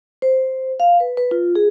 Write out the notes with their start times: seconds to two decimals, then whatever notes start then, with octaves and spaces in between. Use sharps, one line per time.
0.22 C5
0.80 F5
1.00 B4
1.17 B4
1.31 F4
1.56 G#4